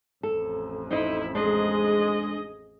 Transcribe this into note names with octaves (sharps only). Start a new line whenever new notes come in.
A1 F2 A4
D#4 E4 C5 D#5
G#3 D4 G#4 C5 D#5